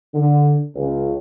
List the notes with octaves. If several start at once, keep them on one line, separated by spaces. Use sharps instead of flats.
D3
C#2